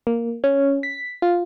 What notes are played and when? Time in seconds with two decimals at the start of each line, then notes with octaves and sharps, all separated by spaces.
0.07 A#3
0.44 C#4
0.83 B6
1.22 F4